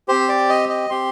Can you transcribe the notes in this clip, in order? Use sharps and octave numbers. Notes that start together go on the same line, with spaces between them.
C4 G4 C5
D5
D#5
D#5
C4 G4 C6